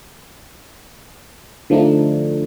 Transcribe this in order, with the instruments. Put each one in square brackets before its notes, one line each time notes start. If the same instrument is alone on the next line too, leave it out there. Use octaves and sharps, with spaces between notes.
[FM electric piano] D3 F3 A3 D4 D#4